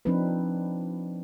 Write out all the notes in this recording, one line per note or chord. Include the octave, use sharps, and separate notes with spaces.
F3 C4 D4 D#4 B4